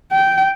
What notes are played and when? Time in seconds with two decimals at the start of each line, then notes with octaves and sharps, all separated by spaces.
0.12 G5